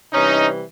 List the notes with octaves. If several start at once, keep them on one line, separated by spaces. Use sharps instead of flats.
C3 E3 G3 C#4 D#4